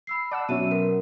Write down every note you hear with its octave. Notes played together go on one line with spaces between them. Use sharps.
B5 E6 C7
D5 F#5 A5 E6
B2 F#3 C#4 E5 D#7
F#4 A#4 B4